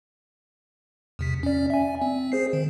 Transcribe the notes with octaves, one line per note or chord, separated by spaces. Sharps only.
E2 C3 B6
C#4 D5
E5 G#5
C4
G#4 C5 C7
D#3